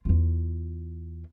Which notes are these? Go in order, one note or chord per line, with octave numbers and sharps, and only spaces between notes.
E2 F4